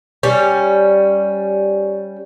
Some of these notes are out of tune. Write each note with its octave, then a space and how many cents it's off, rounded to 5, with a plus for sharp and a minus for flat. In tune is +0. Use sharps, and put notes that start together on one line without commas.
G3 +0 C#4 +0